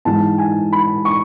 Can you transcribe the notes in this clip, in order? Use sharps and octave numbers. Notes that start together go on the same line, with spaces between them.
G#2 E3 A5
G#5
B5
C#6